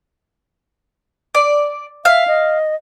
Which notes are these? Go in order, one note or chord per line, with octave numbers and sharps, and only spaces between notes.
D5
E5 F5
D#5